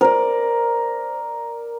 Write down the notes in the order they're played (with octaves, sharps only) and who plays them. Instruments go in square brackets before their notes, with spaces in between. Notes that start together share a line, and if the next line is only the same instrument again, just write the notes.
[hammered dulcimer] A#4 D5 [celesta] C5